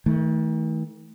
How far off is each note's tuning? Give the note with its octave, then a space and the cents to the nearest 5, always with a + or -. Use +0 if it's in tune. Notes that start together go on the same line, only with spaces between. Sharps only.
D#3 +45 A3 +0